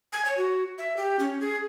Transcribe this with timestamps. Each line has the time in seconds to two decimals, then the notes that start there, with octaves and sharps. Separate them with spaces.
0.13 G#5
0.25 C#5
0.37 F#4
0.78 E5
0.97 G4
1.19 C#4
1.40 G#4